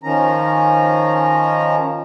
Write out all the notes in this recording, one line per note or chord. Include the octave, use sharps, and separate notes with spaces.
D#3 F3 C#4 A#5